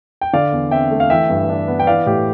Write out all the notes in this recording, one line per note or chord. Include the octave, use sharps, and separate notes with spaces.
G5
D3 D5 F5
E2
C4 E5 G5
A3
F5
E3 E5 G5
G2
D4
B3
G5
E3 D5 F5
A2 G4